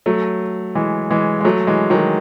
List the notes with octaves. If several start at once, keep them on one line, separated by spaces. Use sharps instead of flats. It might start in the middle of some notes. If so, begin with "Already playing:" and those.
F#3 A3
E3 G#3
E3 G#3
G#3
F#3 A3
E3 G#3
D#3 F#3